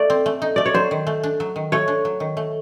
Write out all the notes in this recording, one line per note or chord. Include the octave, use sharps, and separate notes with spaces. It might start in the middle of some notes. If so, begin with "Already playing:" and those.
Already playing: A3 D#4 D5
C4
A3
D#4
A3 D5
C#5
F#3 C5
D#3
A3
D4
F#3
D#3
A3 C#5
D4
F#3
D#3
A3